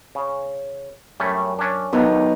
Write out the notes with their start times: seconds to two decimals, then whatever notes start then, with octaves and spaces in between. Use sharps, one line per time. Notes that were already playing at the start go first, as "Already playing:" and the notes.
0.15 C#3
1.20 F#2 G3 A3 C#4
1.59 C#4 D4
1.93 D#2 D3 F#3 B3 D#4